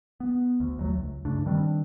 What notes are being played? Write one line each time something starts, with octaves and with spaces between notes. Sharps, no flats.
B3
D2
D#2 F#3 A3
C#2
G2 C#3 A3 D4
D#3 G3 C4 D4